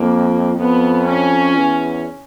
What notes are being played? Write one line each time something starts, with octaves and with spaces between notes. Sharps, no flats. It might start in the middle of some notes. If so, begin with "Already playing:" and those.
Already playing: F2 A#3
F2 B3
C#4
E2